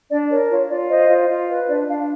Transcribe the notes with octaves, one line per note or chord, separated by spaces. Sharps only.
D4 D5
A#4 C#5
F4 C#5
F4 D5
C5 D#5
F4
F4
B4
D4 D5
D4 F5